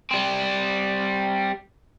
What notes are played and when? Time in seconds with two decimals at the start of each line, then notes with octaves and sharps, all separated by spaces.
0.11 G3 C4